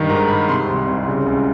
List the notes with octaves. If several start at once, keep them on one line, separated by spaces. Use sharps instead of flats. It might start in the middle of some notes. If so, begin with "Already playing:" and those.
Already playing: G2 D#3
G#2 A#5
G#2 B5
C3 C6
C2
C2
C#3
C#2